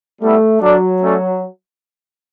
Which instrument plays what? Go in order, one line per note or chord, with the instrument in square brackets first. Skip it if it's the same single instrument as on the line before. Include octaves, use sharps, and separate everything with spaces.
[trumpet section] G3 B3 E4 A4 E5 [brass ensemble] A3
[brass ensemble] F#3 [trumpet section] D4 A4 D5
[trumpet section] A3 C#4 F#4 A4 D5